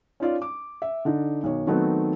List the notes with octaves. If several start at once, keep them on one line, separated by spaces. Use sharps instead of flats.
C#4 D#4 F4 D5
D6
E5
D3 D4 D#4
B1 D#3 C#5
D#3 F#3 A3 B3 C4 D#4